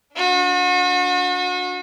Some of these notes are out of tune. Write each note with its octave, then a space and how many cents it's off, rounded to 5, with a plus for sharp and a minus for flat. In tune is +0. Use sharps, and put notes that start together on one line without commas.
D4 -25 F#4 -40